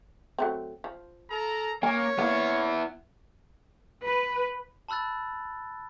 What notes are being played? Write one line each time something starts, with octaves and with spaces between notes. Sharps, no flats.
F#3 A3 C4
F3
A4 A#4 A#5
A#3 C#4 C#5 G#5
A#3 B3 E4
B4
A5 B5 E6 F#6 A6